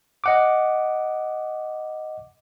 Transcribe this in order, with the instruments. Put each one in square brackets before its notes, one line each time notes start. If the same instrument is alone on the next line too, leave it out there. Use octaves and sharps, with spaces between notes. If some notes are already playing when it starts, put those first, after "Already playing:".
[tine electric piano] D#5 F#5 D6